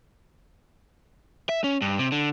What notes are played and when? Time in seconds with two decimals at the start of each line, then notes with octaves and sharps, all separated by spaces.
1.49 E5
1.64 C#4
1.82 G2
1.99 C3
2.12 D3